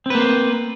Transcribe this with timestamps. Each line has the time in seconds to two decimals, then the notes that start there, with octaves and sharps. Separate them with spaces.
0.06 C4
0.10 B4
0.15 A#3
0.19 C5